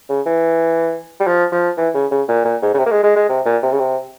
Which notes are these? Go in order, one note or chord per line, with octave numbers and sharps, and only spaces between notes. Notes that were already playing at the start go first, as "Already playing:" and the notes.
C#3
E3
G3
F3
F3
E3
C#3
C#3
A#2
A#2
G#2
C#3
C3
A#3
G#3
G#3
G#3
C3
A#2
C3
C#3
C3